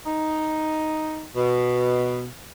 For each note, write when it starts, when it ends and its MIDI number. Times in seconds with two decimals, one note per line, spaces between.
0.06 1.25 63
1.35 2.26 47